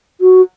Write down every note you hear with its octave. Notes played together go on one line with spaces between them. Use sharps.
F#4